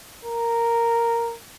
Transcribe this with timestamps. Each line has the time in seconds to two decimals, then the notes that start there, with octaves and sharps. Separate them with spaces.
0.25 A#4